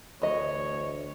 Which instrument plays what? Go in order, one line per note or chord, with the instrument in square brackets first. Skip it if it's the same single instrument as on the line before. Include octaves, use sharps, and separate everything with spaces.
[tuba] D2 [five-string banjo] E3 D#5 [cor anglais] C#5